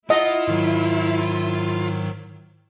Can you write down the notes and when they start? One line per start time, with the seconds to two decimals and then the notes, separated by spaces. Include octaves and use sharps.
0.10 E4 F4 D#5 F#5
0.48 G#2 D#3 F#3